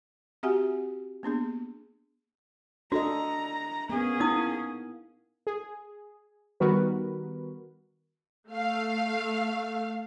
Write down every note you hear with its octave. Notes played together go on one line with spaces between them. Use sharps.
C4 F#4 G4 E5 F#5 G#5
A#3 B3 D4 G#4
D4 F#4 A4 D#5 A#5
A#3 B3 C#4 G#4
A#3 D#4 E4 D#6
G#4
D#3 G3 B3 F#4 A#4 B4
A3 F5